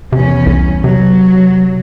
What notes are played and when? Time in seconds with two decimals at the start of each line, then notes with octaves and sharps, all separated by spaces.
0.12 E2 C3 C#4
0.46 C2
0.84 C3 F#3